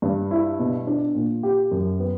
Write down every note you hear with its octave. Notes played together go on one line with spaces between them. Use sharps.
G2
E4
B2
D4
A#2
G4
F#2
B3